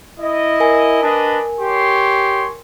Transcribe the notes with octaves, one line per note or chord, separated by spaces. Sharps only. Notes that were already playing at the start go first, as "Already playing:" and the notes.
E4 D#5
A#4 G#5
D4 B4 D#5
G4 C#5 C6